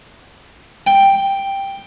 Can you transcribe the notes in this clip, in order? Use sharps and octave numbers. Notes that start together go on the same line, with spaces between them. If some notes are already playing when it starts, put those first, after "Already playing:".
G5